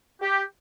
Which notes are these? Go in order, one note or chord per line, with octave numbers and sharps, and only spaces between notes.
G4